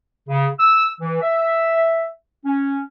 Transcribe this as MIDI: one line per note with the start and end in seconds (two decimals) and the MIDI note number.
0.29 0.48 49
0.60 0.89 88
1.01 1.20 52
1.22 2.07 76
2.45 2.81 61